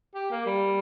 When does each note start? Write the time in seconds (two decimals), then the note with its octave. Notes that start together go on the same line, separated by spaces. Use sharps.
0.15 G4
0.31 A#3
0.46 G3